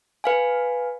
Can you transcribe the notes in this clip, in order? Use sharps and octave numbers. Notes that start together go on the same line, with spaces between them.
B4 F5 G#5